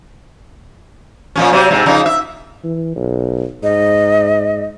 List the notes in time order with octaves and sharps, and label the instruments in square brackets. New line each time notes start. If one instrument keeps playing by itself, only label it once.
[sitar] A#2 F3 C#4
C3 F#3 C5
G#2 C3
C#3 F3 D#4
E5
[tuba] E3
B1
[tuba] G#2 [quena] D#5